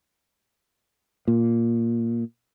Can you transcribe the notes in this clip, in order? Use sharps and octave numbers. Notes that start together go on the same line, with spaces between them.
A#2